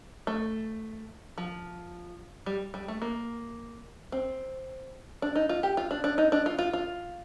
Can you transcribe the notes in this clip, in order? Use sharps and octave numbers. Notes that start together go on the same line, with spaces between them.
A3
F3
G3
G3
A3
A#3
C4
D4
D#4
F4
G4
F4
D4
D4
D#4
D4
F4
F4
F4